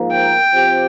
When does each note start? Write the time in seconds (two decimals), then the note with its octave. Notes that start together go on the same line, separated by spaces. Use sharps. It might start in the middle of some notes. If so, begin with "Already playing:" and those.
Already playing: G#2 F3 A#3
0.11 G5
0.54 F3 C4 G4